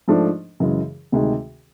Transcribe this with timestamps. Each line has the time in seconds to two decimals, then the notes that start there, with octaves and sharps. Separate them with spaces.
0.08 G#2 F3 A3 D4
0.60 F#2 C#3 E3 G#3
1.12 D2 C3 D#3 G#3